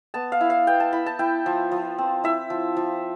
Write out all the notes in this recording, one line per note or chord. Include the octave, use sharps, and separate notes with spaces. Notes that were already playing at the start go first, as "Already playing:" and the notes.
B3 A5
F5
E4
F5
B3 G5
A5
E4 B5
A5
E4 G5
F3
F3
C4
E4 E5
F3
F3